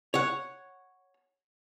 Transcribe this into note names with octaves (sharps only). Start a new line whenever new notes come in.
C#5 F#5